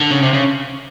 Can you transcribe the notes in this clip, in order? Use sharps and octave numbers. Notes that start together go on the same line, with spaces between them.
D3
C#3
C3
C#3